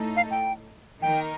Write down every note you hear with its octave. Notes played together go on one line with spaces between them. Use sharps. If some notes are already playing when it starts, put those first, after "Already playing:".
Already playing: A2 A3 D#4 A4
F5
G5
D#3 A#3 D#4 A#4 G5